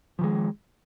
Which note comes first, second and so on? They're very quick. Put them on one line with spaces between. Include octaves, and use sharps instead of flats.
F3 D#3 G#3